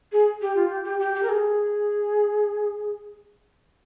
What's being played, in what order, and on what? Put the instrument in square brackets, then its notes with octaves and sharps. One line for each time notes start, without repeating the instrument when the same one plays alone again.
[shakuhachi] G#4
G4
F4
G4
G4
G4
G4
A#4
G#4